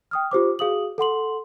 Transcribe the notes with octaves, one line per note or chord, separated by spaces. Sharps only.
G5 D#6 F6
F4 G4 C5 D6
F#4 G#4 F5 D#6 F#7
A4 F#5 C6 F#7